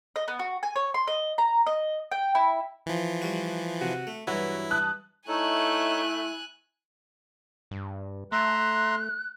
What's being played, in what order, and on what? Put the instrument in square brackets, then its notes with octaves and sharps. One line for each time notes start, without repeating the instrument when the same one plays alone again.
[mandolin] D#5
B3
F#4
G#5
C#5
C6
D#5
A#5
D#5
G5
E4
[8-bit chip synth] E3 F3
[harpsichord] G3 F#4
[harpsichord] C3 [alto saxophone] F#4
[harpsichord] A3
[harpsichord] G2 E3 [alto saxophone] F#3 [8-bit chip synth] E4 [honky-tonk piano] F#4
[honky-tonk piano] A5 D#6 F#6
[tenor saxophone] A3 [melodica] D#4 A4 C#5 [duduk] E4 [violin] G#5 F#6
[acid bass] G2
[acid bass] A3 [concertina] E5 A#5 C6 [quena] F#6